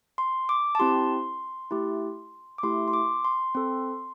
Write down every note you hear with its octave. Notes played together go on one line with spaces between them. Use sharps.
C6
D6
A5
C4 E4 G4 C6
A3 E4 G4
D6
A3 E4 G4 C6
C6
D6
C6
C4 A4